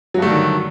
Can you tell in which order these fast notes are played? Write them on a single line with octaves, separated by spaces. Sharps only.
F#3 G2 A3 D3 D#3